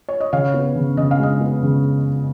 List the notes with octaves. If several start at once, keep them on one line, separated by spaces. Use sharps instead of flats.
C#5
D#5
C#3 C#5 F5
B3
C#3
C#3 D#5
F5
G#3 D#5
B3
C#3